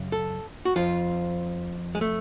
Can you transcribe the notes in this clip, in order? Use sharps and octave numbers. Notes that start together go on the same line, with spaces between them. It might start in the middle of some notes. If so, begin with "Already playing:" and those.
Already playing: F#2 C#3
A4
F#4
F2 F3 F4
G#3
A3